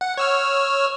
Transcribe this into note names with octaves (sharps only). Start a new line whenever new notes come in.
F#5
C#5 E6 F6